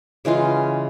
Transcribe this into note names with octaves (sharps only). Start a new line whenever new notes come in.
C#3 E3 G#3 F4